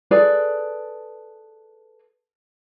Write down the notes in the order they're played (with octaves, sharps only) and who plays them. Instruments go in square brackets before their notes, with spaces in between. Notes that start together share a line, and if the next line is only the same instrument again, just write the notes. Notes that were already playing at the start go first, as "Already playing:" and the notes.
[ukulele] G#4 A4 B4 D5